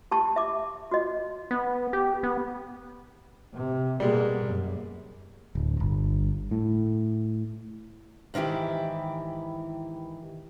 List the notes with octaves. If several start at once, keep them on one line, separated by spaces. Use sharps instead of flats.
G4 A5 C#6
E5 D6
F#4 D#5
B3
G4
B3
C3
B2 G3 G#3 A#3
F#2
D1
G1
A2
G#2 D#3 E3 E4 G4